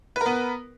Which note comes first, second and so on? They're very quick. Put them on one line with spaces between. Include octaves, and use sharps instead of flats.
B4 A#4 B3